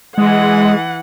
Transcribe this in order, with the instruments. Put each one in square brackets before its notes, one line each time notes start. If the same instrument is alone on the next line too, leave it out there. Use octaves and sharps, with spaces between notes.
[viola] E3 F#5 [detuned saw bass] G#3